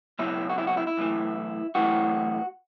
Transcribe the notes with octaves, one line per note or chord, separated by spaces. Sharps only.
C#2 B2 F#3 E4
F#4
E4
F#4
E4
E4
B1 A2 E3
B1 A2 E3 F#4